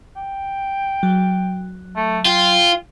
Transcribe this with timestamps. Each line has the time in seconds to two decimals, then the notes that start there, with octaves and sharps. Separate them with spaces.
0.16 G5
1.03 F#3
1.96 A3
2.25 F4 G5